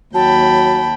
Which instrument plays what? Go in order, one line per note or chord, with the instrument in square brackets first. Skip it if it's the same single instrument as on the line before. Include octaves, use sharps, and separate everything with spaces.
[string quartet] D#2 G5 B5 [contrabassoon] F#3 [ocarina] A5